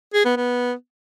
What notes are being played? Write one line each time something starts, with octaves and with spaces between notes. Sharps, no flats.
G#4
B3
B3